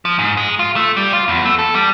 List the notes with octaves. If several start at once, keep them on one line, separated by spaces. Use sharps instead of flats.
F3
G#2
G#3
F4
A3
G3
F4
E2
A3
A4
G3